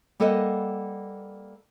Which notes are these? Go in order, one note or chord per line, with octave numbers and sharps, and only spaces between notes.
G3 A#3 A4 B4 D#5 F#5